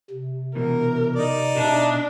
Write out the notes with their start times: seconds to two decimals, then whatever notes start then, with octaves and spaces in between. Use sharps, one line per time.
0.11 C3
0.55 B2 E3 A#4
1.16 D#4 D5
1.57 B2 D4 E5 A5